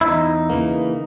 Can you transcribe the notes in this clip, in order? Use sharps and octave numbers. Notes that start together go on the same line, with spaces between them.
E4
E2 D#4
C#3 E3 A#3